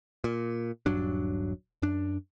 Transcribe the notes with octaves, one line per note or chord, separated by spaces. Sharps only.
A#2
D#1 G2 F#3 D4
F#2 D4